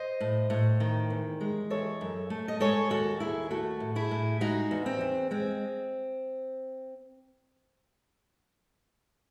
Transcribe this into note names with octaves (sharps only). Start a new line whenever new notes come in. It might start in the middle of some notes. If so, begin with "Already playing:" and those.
Already playing: C5 D#5
A2
A2
D#3
E2
G#3
E3 A4 C#5
F#2
A3
D#5
G#3 A4 C#5
D#2 F#4 A4
D#2 E4 G#4
A3 F#4 A4
A2
E4 G#4
A2
G#3 D#4 F#4
E2
C4
E2
G#3 C4